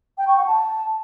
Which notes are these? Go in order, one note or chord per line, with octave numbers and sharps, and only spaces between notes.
G5
C#6
F#5
A5